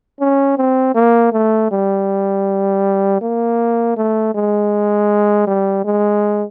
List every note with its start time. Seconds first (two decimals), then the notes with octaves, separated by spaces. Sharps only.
0.20 C#4
0.57 C4
0.95 A#3
1.32 A3
1.71 G3
3.21 A#3
3.97 A3
4.35 G#3
5.47 G3
5.85 G#3